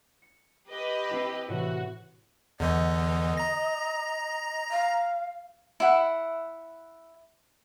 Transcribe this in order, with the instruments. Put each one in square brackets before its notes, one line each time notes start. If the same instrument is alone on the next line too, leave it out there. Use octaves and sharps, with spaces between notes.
[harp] C#7
[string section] G4 B4 D#5
[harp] C4 E4 A5
[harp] A2 C3 E3 [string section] F#4
[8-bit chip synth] E2 D3 E3 [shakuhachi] D#5
[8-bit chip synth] A#5 A#6
[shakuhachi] F5
[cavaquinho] E4 F#5